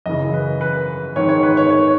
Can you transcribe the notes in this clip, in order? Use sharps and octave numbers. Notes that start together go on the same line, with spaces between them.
F#2 C#3 E3 D#5
B4
B4
G#2 D#3 C#5
C#5
B4
C#5
C#5